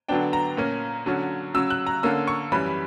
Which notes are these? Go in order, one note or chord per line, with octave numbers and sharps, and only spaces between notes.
D3 F#3 B3 D4 G5
A#5
A#2 A#3 C#4
D3 F#3 C#4
C#3 F#3 C#4 E6
F#6
A#5
D3 A#3 C#4 E6
C#6
F#2 E3 G3 C#4 B5